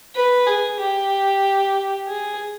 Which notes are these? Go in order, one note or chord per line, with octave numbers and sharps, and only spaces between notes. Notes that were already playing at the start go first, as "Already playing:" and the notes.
B4
G#4
G4
G#4